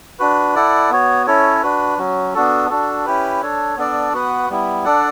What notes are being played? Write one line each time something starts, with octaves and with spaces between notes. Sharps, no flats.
D4 F#4 B4
E4 A4 D5 F#5
B3 F#4 C#5
C#4 E4 A4 C#5
D4 F#4 B4
F#3 C#4 F#4
B3 D4 F#4 A4
D4 F#4 A4
C#4 E4 G4 B4
D4 A4 C#5
B3 D4 A4 D5
B3 F#4 B4 F#5
G3 B3 E4
D4 A4 D5 F#5